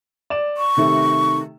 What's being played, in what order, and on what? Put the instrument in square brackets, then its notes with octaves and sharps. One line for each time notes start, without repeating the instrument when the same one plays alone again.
[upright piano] D5 E7
[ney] C#6
[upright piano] C3 D#3 A3